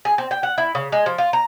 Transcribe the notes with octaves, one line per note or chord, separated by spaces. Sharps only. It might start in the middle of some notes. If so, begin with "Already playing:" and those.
G#4
C4
G5
F#5
E4
C#3
G#3
F3
F4
A#5